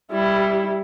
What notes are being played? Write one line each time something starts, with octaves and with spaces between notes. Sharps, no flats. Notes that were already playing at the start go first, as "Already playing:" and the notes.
G3 E4